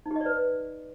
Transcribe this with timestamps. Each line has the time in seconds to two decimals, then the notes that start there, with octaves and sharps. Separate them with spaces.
0.06 D#4
0.11 G4
0.16 D#5
0.21 D5
0.26 B4